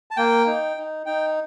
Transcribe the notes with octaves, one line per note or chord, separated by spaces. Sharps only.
A5
A#3 G5
D#4
D#4
D#4 G5